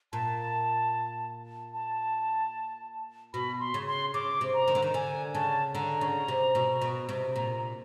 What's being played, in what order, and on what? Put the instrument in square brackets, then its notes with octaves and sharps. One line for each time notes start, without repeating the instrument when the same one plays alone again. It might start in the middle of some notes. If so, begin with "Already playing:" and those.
[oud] A#2 [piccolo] A5
[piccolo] A5
[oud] B2 [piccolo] B5
[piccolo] C6
[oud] C#3
[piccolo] C6
[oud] C#3 [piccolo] D6
[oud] C3
[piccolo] A#5
[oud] D#3
D3
D#3
[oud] D3 [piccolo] G#5
[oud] C#3 [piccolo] A5
[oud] D3 [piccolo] A#5
[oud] C#3
C3
B2
B2
C3
[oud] A#2 [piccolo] A#5